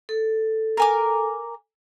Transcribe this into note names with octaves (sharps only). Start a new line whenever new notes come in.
A4
A#4 G#5 D6